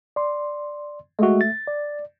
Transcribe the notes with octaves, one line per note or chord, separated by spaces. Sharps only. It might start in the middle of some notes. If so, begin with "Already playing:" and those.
D5 C6
G#3 A3 F#4 E5
A6
D5